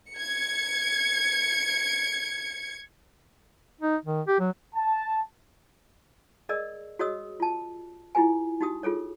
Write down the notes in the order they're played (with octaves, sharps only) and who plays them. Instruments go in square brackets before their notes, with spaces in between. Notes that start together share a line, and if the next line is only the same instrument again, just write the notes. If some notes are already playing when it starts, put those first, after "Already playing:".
[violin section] G#6 C#7
[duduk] D#4
D#3
G4
F#3
[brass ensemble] A5
[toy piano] G#4 A#4 D5 D#5 E6
F#4 G#4 C#5 D#5 D#6 E6
F4 A5
E4 F4 G4 B4 G#5
D#4 F#4 G4 D#6
F4 G#4 A4 C#5